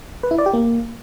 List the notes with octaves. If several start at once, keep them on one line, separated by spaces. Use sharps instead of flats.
B4
E4
D5
G4
A#3